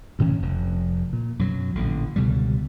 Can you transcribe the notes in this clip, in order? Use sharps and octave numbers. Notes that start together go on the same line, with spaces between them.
D2 A2 E3 C#4
F1 F2
A#2
F#2 B2 F#3
A1 A#2 D3
C#2 B2 D3 G3